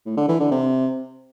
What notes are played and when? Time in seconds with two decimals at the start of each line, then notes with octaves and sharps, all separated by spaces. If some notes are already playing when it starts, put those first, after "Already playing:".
0.06 A2
0.17 D3
0.29 E3
0.40 D3
0.51 C3